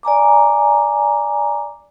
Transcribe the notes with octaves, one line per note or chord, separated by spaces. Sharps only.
D5 G#5 A#5 D6